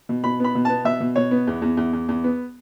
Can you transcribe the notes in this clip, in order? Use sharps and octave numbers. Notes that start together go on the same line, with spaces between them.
B2
B2 B5
B3 B5
B2
B3 A5
B2 E5
B2
B2 C#5
B3
E2
E2
E2
E2
E2
B3